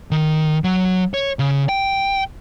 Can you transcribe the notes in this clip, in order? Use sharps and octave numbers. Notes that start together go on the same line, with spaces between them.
D#3
F#3
C#5
C#3
G5